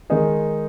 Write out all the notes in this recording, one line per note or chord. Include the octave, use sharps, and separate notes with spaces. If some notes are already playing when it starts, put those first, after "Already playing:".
D#3 G#3 D#4 G#4